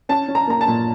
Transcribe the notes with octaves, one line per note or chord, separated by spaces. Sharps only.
C#4 A5
C#4
A#5
A#3 A#5
A5
A#2